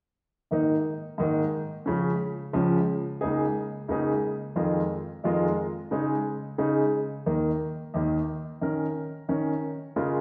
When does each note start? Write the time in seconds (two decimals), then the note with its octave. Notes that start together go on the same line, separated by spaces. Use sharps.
0.51 G#2 D#3 A#3 D#4
1.18 G#2 D#3 A#3 D#4
1.86 C#2 C#3 F3 C#4
2.53 C#2 C#3 F3 C#4
3.21 C#2 C#3 A#3 D#4 G#4
3.88 C#2 C#3 A#3 D#4 G#4
4.56 F2 D#3 G#3 F4 A#4
5.24 F2 D#3 G#3 F4 A#4
5.91 C#3 G#3 D#4 G#4
6.58 C#3 G#3 D#4 G#4
7.26 D#2 D#3 A#3
7.94 D#2 D#3 A#3
8.61 D#3 C#4 A#4
9.29 D#3 C#4 A#4
9.96 C#3 G#3 F4 A#4